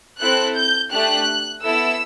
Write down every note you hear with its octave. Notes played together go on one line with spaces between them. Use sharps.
C4 E4 A4 F#6
G6
A3 D4 G4 F#6
B3 E4 A4 E6